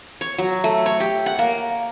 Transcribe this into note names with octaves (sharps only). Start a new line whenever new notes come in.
C#5
F#3
A3
C#5
G4
F#5
A#3